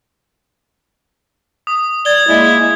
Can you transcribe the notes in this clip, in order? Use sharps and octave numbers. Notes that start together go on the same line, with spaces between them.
D#6
D5 G#6 G7
G#3 A#3 E4